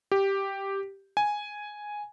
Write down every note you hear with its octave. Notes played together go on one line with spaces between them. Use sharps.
G4
G#5